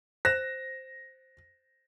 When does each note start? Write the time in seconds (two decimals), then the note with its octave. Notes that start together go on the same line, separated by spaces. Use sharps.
0.25 C5 A#6 E7